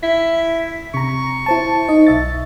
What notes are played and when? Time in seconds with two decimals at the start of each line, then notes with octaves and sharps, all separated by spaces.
0.03 E4 B6
0.94 C3 A#5 C#6
1.46 E4 C5 A5
1.89 D#4 D#5
2.07 B1 E5 A6